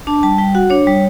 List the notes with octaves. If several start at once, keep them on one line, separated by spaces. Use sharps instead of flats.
D4 A5
G3 A5
G3 G5
F#4 F#5
D4 C#5
G3